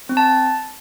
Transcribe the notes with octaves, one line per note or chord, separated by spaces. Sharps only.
C4
A5